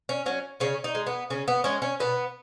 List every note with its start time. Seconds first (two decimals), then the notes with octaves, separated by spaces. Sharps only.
0.09 C#4
0.26 F#3 C#4
0.60 C#3 C#4
0.84 D#4
0.95 G#3
1.07 B3
1.30 C#3 C#4
1.48 B3
1.64 G#3 C#4
1.82 C#4
2.00 B2 B3